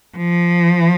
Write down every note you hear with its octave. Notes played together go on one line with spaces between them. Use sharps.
F3